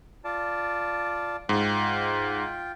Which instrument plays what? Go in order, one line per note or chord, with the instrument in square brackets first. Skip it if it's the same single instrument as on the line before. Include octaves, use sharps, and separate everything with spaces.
[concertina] F4 D5 A5
[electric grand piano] G#2 [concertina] F4 G5